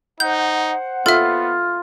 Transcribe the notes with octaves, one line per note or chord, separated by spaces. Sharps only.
D#4 C5 F#5 G6
B3 F4 A4 E5